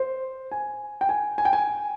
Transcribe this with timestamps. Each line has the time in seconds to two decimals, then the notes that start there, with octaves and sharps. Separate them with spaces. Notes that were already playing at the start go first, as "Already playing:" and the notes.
Already playing: C5
0.51 G#5
1.01 G5
1.09 G#5
1.38 G#5
1.45 G5
1.53 G#5